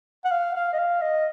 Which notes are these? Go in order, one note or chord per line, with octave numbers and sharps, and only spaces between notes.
F#5
F5
F5
D#5
F5
D#5